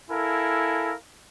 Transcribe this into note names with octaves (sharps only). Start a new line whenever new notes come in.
E4 A4 A#4 F5 G#5